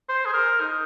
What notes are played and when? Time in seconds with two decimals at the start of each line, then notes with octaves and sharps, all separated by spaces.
0.09 C5
0.26 G#4
0.34 A#4
0.60 D#4